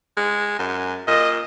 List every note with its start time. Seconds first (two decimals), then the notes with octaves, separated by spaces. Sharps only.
0.17 G#3
0.59 F#2
1.08 A#2 D#5